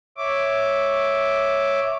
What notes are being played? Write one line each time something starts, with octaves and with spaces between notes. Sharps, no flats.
C#5 E5 D6